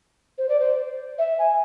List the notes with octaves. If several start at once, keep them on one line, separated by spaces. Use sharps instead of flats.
C5
D5
C5
E5
G#5